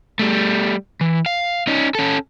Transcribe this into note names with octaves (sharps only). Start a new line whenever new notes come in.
G3 A3
E3
F5
C#4 D#4
C#4 A4